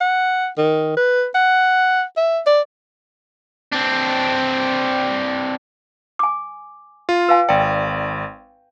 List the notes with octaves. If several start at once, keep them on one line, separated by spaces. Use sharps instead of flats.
F#5
D#3
B4
F#5
E5
D5
C4 D4
G#5 D6
F4
B4 F5 G#5
G#1 D5 G5